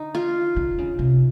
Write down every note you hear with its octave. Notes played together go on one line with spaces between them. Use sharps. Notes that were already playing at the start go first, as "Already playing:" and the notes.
Already playing: D3 D#4
F4
D3
C#3
C3